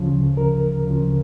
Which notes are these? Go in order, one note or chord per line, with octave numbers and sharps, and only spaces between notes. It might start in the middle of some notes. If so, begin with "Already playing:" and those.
Already playing: D2 C#3 F3
A#4
D2 C#3 F3